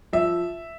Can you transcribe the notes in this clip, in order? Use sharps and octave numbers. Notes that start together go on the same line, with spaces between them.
F3 E5